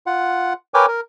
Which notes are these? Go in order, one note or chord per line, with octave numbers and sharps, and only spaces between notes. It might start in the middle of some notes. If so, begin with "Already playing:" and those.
F4 F#5
A#4 B4 C#5 G5 G#5 D6
A#4